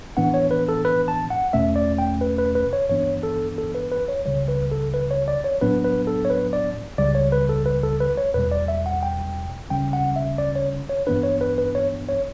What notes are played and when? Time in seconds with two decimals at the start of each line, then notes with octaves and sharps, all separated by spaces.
0.17 A2 E3 B3 D4 F#5
0.34 C#5
0.51 B4
0.69 A4
0.85 B4
1.08 A5
1.30 F#5
1.53 E2 B2 A3 C#4 E5
1.76 D5
1.98 G5
2.21 B4
2.38 B4
2.55 B4
2.73 C#5
2.90 G2 E3 B3 D4 C#5
3.23 A4
3.58 A4
3.75 B4
3.92 B4
4.08 C#5
4.26 C#2 C#3 G3 C#5
4.48 B4
4.71 A4
4.94 B4
5.11 C#5
5.28 D5
5.44 C#5
5.61 A2 F#3 B3 D4 B4
5.85 B4
6.07 A4
6.25 C#5
6.30 B4
6.53 D5
6.98 C#2 C#3 G3 D5
7.15 C#5
7.32 B4
7.49 A4
7.66 B4
7.83 A4
8.00 B4
8.17 C#5
8.34 E2 B2 G3 B4
8.52 D5
8.68 E5
8.86 F#5
9.03 G5
9.70 D2 C#3 G3 C#4 G5
9.93 F#5
10.16 E5
10.38 D5
10.56 C#5
10.89 C#5
11.07 G2 E3 B3 D4 B4
11.23 C#5
11.41 B4
11.58 B4
11.75 C#5
12.09 C#5